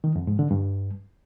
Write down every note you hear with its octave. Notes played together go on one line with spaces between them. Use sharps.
D#3
F2
G#2
D3
G2